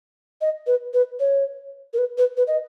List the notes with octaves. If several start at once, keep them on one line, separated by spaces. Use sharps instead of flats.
D#5
B4
B4
C#5
A#4
B4
B4
B4
D#5